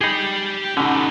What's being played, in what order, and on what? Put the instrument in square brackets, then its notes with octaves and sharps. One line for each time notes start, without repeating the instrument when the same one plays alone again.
[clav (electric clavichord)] D#4 G#4 [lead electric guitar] G4 B5
[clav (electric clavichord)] B2 D3 [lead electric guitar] C#4 D#4